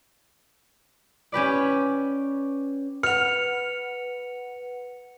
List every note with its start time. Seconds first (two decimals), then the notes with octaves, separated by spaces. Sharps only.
1.32 C#4 G4 B4 D5
3.03 B4 F#5 F6 C#7 F7